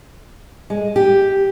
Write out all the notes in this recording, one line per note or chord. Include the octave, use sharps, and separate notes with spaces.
G#3
G4